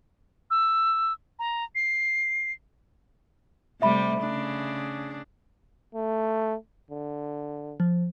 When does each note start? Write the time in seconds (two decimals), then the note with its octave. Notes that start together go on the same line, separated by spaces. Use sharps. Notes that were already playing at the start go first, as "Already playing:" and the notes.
0.51 E6
1.39 A#5
1.75 C7
3.82 C3 G3 A3 E5 B5
4.23 C#3 D4 G#4
5.94 A3
6.91 D3
7.80 F3